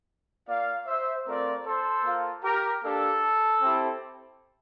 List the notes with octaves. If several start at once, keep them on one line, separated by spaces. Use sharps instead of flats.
A#3 F4 D5 F5
C5 E5
A3 C4 F4 A#4 D5
A4 C5
A#3 F4
G4 A#4
A#3 D4 G4 A4
C4 E4 G4